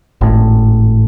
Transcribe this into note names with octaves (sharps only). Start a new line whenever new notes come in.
G#1 A2